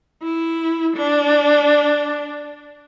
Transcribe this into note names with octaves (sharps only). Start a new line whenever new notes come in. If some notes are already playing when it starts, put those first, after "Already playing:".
E4
D4